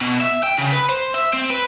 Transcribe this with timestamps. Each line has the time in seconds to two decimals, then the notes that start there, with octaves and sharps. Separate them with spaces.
0.01 B2
0.21 E5
0.43 G5
0.58 C#3
0.72 B4
0.89 C5
1.14 E5
1.33 C4
1.50 B4